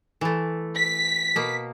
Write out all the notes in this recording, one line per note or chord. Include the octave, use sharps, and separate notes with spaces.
E3 A3
B6
B2 A#3